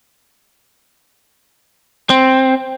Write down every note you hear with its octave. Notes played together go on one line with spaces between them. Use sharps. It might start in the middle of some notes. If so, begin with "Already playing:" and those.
C4